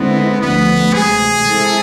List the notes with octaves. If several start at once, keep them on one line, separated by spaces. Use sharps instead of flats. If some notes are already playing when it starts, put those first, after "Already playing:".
Already playing: D3 G#3 B3 C4 E4
D2 D3 F3 A3 B3
D2 C3 E3 G#3 G#4
C3 G#3 C4 E4 A4